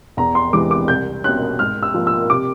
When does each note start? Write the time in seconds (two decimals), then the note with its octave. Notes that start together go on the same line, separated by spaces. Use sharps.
0.17 E2 A#5
0.35 C6
0.53 C3 E3 G#3 D6
0.71 D6
0.88 C2 G6
1.24 B2 G3 A#3 C#4 F#6
1.59 G#2 F6
1.83 E6
1.94 F3 A#3
2.07 E6
2.30 C3 D6